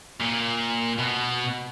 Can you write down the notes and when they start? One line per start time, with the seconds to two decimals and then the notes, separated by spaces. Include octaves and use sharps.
0.20 A#2
0.98 B2 B3